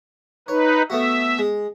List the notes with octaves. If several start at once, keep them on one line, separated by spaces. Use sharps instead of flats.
D#4 B4 C#5
A3 B3 F#4 E5
G#3